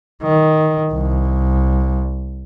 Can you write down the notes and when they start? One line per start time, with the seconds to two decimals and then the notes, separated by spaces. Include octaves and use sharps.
0.23 D#3
0.92 C2